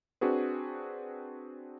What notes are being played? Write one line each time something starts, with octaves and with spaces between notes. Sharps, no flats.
C4 D4 F#4 G#4 B4